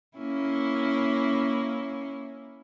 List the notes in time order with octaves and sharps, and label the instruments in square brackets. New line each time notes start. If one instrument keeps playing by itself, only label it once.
[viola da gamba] A#3 C#4 E4